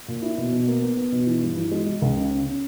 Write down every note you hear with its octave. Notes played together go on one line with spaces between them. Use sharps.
A#2
E4
B2
B2
A#3
B3
B3
B2
E3
G2
E3
G#3
G#3
C#2
C#3
C#4
C#4